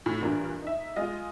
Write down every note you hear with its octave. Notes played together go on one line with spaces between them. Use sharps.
A2
G2 A#2 E3 D4 A#4
D#4 E5
G#3 F4 D#5